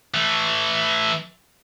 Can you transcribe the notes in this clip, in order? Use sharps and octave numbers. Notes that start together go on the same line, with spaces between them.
E3 A3